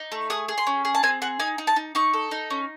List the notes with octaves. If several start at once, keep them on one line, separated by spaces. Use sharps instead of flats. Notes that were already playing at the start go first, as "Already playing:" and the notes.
Already playing: D#4
A3
G#4 D#6
G#4
C6
C#4
G#4
A5
C4 G#5
G#4 F#5
D#4 G#5
D#4
A5
D#4
D#4 C#6
A4
D#4
C#4